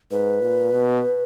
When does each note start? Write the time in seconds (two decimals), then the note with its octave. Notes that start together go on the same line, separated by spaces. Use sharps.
0.11 G#2 B4
0.42 A#2
0.72 B2